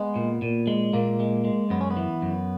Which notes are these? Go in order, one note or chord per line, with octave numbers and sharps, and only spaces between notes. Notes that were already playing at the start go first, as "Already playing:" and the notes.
Already playing: G#3 B3
A#2
A#2
G#3
A#2 A#3
G#3
G#3
F#2 B3
C#4
B3
E3
F#2